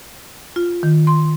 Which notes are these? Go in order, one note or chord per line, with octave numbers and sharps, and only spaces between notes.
F4
D#3
C6